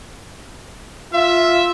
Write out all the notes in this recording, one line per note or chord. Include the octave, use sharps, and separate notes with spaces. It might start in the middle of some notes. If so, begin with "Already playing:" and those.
F4 E5